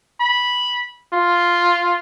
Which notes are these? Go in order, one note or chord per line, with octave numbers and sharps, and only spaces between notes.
B5
F4